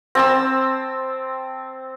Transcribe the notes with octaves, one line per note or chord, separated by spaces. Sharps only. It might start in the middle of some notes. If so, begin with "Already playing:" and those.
C4 A5 E6